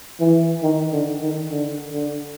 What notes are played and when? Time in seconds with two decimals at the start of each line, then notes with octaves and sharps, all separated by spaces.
0.20 E3
0.62 D#3
0.92 D3
1.21 D#3
1.50 D3
1.93 D3